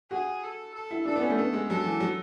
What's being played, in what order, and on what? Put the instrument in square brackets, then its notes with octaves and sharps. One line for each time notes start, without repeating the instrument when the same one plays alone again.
[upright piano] F#4 [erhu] G#4
[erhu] A4
A4
[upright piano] E4
[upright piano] D4 [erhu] A4
[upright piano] B3
C#4
A3
[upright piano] B3 [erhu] A4
[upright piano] G#3
[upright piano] F#3 [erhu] A4
[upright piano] E3
F#3